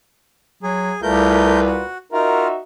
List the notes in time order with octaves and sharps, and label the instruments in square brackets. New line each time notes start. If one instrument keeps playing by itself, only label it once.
[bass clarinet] F#3 [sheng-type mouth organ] G#4
[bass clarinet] C2 [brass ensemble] A#2 F4 B4 [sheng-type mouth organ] A3 A#4 G6
[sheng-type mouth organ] F#4
[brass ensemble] D#4 F#4 E5 [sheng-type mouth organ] F4 [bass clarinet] A#4